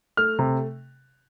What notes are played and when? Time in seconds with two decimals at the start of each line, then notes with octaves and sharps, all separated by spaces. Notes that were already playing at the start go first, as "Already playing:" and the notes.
0.17 A3 F6
0.39 C3